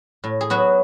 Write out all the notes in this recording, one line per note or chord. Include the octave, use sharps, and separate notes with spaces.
A2
G#4
F#3 B3 F#4